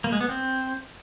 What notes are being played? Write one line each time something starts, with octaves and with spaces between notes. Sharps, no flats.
A#3
G#3
B3
C4